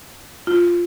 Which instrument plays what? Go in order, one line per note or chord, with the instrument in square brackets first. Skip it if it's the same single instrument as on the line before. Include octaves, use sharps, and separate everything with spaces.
[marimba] F4